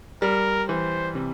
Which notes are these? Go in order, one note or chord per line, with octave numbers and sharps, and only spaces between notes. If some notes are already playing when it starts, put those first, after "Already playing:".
G3 A#4
E3 C5
C3